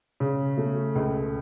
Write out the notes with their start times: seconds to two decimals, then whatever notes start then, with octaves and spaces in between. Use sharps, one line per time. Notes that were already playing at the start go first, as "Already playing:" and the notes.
0.20 C#3
0.57 A3
0.95 C#2